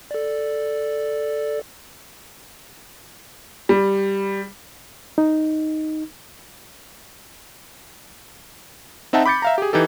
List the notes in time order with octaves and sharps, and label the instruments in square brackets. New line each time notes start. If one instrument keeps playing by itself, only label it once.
[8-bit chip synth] A4 D5
[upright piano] G3
[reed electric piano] D#4
[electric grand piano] C4 D#4 E5 F#5 A5
B5 D6 G6 A6 C#7
E5 F5 A#5
G4 G#4
E3 D#4 G4 A4